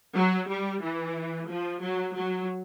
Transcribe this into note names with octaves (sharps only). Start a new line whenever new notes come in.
F#3
G3
E3
F3
F#3
F#3